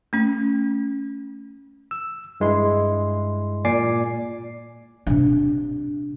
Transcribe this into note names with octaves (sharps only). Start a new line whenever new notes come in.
A3 C#4
E6
G2 G#3 E4 C6
A#2 D5 G#5 D6 C7
C3 D4